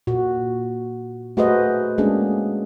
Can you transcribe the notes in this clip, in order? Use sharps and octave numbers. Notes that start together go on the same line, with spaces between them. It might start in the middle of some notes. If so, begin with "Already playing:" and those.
A#2 F#4
A3 F#4 G#4 B4 C5 D#5
G#3 A#3 C#4 D4 G#4